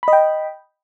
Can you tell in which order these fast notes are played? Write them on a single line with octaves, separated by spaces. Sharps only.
B5 D#5 G5